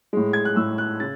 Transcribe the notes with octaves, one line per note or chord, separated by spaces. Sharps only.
A2 G#3
G#6
F#6
A2 G#3 E6
F#6
C#3 A6